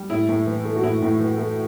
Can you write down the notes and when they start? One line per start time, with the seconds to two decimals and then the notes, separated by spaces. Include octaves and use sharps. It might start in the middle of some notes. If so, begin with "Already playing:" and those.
Already playing: G3
0.10 A2 E4
0.29 A2
0.47 E3
0.65 A3
0.76 F#4
0.83 A2 E4
1.02 A2
1.20 E3
1.38 A3